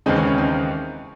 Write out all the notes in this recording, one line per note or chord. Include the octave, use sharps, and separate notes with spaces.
D#2 C#3 E3 G#3 C4 D#4
C#4
C#4
C4 D#4